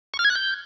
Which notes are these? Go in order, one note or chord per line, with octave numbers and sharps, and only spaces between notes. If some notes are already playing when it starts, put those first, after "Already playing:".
C#6
F6
G#6
F#6
G6